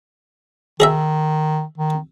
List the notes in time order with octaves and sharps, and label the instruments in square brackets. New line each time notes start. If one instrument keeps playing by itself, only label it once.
[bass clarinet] D#3 [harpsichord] G#4 D#5 E5
[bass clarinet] D#3